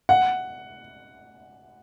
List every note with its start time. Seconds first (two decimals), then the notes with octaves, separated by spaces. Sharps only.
0.09 F#5